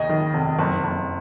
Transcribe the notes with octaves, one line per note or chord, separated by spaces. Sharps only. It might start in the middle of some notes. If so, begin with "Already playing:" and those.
Already playing: D#2 C#3 D#5
D#3
F1
F#1
F#1